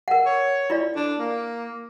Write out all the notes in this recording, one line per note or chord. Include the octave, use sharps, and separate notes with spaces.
A#4 F#5
C#5
E4 F4 D5
D4
A#3